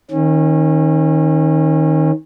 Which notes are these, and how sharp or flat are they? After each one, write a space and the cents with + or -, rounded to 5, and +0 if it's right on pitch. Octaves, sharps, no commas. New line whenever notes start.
D#3 +15 C#4 -30